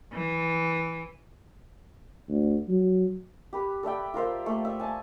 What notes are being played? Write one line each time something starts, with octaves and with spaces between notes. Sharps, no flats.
E3
D2
F#3
G4 B4
A4 D5 E5 G5
F4 A#4 C5 E5
A3 A#3
E5
G#5 A5